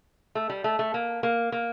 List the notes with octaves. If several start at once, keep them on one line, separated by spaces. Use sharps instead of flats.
A3
G3
A3
A3
A#3
A#3
A#3